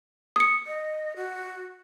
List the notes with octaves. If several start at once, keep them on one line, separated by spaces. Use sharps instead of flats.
D#6 C#7
D#5
F#4